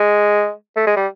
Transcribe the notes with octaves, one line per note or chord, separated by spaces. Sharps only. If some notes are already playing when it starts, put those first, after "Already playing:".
Already playing: G#3
A3
G#3
G3